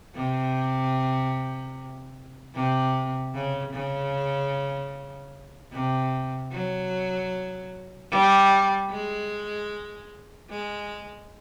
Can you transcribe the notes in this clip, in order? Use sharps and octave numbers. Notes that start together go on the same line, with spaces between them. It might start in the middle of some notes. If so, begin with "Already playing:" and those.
C3
C3
C#3
C#3
C3
F#3
G3
G#3
G#3